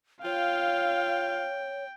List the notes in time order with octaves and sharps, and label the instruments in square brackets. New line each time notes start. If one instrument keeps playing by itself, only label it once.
[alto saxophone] F4 [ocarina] C#5 [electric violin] F5 [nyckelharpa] G5